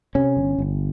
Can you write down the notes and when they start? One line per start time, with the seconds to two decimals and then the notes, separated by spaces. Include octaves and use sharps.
0.15 C3 C#4
0.37 G1
0.59 G1